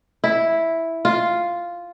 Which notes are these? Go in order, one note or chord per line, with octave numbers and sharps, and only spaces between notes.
E4
F4